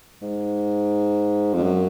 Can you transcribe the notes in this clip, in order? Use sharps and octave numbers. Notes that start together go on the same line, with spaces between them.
G#2
F2
F#2